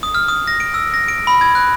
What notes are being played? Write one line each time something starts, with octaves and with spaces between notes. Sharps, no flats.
D#6
F6
D#6
A#6
D7
E6
A#6
D7
B5
G#6
F#6